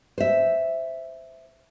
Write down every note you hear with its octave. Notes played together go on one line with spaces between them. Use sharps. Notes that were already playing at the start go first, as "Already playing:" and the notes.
C5 E5